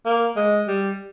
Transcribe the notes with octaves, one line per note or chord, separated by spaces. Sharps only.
A#3
G#3
G3